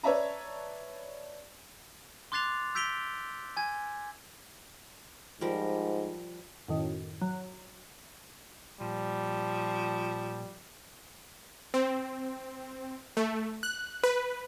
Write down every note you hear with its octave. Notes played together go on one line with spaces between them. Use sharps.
B4 C#5 D5 E5 A5 A#5
C6 D6 F#6 A6 C7 F7
E6 G6 B6 D7 F7 G7
G#5 G#6
G#2 F3 G3 A#4
F#2 A2 D#3
F#3
A#2 F3 G3
C4
A3
F#6
B4